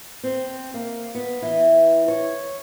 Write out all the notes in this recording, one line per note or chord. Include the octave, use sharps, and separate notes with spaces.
C4
A#3
B3
E3
C#5